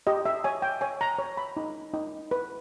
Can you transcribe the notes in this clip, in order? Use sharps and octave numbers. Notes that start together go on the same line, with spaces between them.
G4 D#5
E5
C#5 G#5
G5
C#5 G#5
A#5
C#5
B5
D#4
D#4
B4